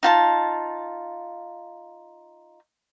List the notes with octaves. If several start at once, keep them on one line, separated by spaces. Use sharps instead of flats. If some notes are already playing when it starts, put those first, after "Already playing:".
D#4 F4 A5